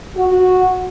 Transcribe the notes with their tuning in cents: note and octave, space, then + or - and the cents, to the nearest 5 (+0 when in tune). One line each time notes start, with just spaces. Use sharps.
F#4 -10